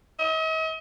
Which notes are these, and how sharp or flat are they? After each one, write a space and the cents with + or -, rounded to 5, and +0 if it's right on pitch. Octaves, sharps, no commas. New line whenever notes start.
D#5 +45